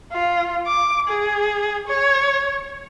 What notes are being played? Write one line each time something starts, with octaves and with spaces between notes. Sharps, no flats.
F4
D6
G#4
C#5